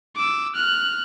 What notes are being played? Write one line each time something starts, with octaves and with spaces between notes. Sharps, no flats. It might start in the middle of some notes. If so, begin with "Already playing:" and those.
D6 E6
F6 F#6